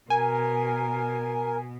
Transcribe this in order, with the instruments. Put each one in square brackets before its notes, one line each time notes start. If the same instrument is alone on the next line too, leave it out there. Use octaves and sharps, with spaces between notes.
[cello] B2 [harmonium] A#4 [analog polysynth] G#5